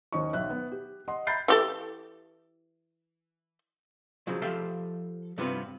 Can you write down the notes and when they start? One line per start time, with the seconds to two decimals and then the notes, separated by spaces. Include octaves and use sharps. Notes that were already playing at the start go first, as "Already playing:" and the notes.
0.12 D#2 C#4 C5 D#5 C#6
0.33 B1 E5 F#6
0.50 B3
0.72 G4
1.08 D#5 F#5 C6
1.27 E5 A#5 B5 G6 A6 C7
1.48 E3 G4 A4
4.27 C#3 F3 F#3
4.42 F3 G4 A4 E5 F5
5.38 G2 C3 B3 F4 B4